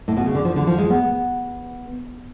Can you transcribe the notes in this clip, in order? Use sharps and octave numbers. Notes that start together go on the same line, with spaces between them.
A2
B2
C#3
D3
F3
D3
F3
G#3
B3